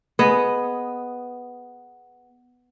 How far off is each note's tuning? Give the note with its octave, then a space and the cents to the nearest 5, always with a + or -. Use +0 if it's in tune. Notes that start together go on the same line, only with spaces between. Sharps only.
B3 +0 G#4 +10 D#5 +0